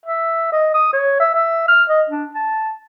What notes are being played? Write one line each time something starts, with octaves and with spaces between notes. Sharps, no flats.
E5
D#5
D#6
C#5
E5
E5
F6
D#5
D4
A5